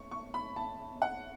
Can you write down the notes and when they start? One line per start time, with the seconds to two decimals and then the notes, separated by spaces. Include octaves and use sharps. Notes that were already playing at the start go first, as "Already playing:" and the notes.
Already playing: C#6
0.11 C#6
0.34 B5
0.56 A5
1.02 F#5